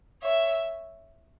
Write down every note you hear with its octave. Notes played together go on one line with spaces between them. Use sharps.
C#5 E5